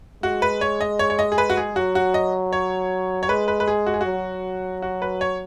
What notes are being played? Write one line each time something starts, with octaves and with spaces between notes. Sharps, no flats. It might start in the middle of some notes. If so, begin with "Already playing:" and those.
G#3 F#4
B4
C#5
D#5
C#5
C#5
D#5
G#4
B4
F#4
G#4
F#3 F#4
F#4
D#5
C#5
C#5
G#3 B4
B4
B4
G#4
F#4
G#4
F#3 F#4
F#4
B4
C#5